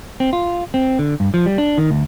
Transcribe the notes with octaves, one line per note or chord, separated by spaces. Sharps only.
C4
F4
C4
D3
G2
F3
G3
D4
D#3
D2